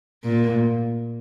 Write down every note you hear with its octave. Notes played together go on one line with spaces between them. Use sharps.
A#2